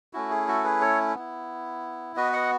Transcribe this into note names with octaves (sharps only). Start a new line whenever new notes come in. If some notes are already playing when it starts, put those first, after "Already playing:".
A3 C#4 E4 F#4
G#4
F#4 A4
G#4 B4
A4 C#5
B3 E4
B3 F#4 B4 D#5
D#5 F#5